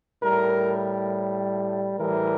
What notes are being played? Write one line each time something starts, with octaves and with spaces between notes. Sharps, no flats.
A2 G3 A#4
A2 E3 G3 A#4